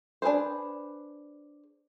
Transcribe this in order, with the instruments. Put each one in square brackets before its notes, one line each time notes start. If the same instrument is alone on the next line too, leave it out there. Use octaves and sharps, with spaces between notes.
[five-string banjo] D4 G#4 A4 B4 C5